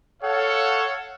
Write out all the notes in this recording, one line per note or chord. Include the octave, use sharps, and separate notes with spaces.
A4 C#5 F5 F#5